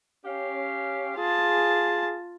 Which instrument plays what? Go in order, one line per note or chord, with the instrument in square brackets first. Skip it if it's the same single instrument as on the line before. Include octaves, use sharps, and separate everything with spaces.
[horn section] C#4 G4 F5
[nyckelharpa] F4 A5 [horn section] G#4